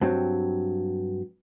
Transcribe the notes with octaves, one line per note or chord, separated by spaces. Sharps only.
G2 F#3 C4